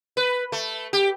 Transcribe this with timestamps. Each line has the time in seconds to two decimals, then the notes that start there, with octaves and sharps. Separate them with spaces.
0.17 B4
0.52 A3
0.93 G4